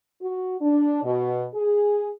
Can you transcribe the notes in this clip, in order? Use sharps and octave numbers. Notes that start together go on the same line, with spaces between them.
F#4
D4
B2
G#4